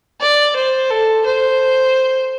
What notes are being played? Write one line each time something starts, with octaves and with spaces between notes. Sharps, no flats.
D5
C5
A4
C5